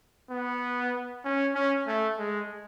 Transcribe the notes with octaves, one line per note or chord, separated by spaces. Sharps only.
B3
C#4
C#4
A3
G#3